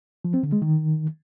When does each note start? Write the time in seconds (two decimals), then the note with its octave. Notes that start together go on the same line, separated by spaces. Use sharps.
0.25 F3
0.34 C4
0.43 D3
0.52 G#3
0.62 D#3